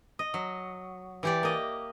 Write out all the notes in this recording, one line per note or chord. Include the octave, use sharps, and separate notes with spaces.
D#5
F#3
E3 G4 D5
A#3 D#5